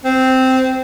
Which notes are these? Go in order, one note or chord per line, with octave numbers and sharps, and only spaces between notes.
C4